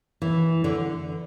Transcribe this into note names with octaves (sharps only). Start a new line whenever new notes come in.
E3
D3